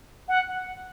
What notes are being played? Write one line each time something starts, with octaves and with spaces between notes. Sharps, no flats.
F#5